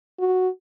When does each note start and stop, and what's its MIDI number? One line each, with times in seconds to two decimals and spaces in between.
0.19 0.48 66